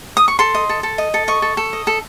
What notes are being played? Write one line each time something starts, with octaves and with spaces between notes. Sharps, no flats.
D#6
C#6
A4 C6
D#5
A4
A4
D#5
A4
D#5 C#6
A4
A4
D#5
A4